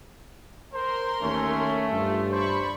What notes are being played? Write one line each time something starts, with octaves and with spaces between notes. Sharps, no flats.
A#4 C5 C6
D#2 A3 C#4
G2 F4
C5 D5 B5 C#6